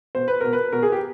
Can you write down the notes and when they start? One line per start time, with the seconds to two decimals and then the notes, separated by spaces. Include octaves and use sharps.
0.15 B2 C5
0.28 B4
0.41 B2 A#4
0.53 B4
0.73 B2 A#4
0.83 G#4
0.92 G4